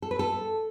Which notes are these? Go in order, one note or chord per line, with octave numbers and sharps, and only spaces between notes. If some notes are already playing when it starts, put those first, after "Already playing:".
A4
B4
A4